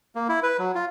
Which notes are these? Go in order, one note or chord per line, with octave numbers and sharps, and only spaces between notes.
A#3
E4
B4
F#3
F4